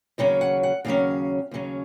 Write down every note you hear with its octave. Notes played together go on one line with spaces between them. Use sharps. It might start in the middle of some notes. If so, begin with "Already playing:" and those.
D#2 C#3 F#3 C#4
F#5
F#5
D#2 C#3 F#3 C#4 F5
D#2 C#3 F#3 C#4